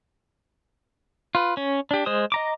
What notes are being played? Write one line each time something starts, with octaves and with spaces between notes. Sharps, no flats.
F4 B4
C#4
D4 G4
G#3 C5 D#6
D#5 A#5 D6